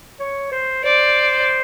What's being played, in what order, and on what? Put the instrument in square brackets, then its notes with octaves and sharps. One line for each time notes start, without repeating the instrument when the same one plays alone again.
[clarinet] C#5
C5
[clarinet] C5 [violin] D5